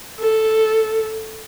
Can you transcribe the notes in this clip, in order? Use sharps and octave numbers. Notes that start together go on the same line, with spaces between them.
A4